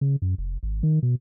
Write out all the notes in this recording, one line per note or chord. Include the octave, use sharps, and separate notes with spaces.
C#3
F#2
F1
G#1
D#3
B2